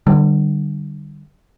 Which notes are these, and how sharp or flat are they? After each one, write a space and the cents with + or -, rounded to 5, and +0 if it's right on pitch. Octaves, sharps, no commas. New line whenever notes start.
D3 +30 G3 -10